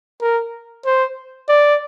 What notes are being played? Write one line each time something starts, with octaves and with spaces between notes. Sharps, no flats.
A#4
C5
D5